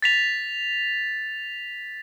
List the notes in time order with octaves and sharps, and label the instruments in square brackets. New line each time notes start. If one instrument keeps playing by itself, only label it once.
[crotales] A6 B6 F7